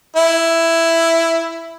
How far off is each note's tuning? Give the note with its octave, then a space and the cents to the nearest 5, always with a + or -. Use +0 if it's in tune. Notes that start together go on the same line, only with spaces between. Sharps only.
E4 +5